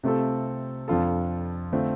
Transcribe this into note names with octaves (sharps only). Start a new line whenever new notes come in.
C3 A3 C4 F4 A4
F2 F3 D4 F4 A4
D3 A3 C4 F4